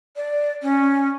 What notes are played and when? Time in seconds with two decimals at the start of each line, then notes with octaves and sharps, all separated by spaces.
0.16 D5
0.62 C#4